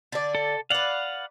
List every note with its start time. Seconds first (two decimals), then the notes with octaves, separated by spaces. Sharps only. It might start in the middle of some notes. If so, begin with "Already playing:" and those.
0.12 D3 D5
0.35 A4
0.70 B4 D5 F5 F#5